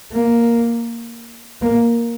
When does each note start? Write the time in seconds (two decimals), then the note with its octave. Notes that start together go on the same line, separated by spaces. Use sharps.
0.12 A#3
1.62 A#3